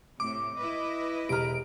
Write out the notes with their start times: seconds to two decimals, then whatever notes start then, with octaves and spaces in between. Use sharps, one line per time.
0.20 A2 C3 D6
0.58 E4 B4 D#5
1.29 E1 G4 A#5 F6 D7